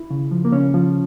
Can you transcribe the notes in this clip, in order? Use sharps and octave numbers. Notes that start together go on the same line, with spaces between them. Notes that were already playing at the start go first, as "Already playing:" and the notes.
Already playing: E4
C#3
F3
A#3
C#3 C#4
F3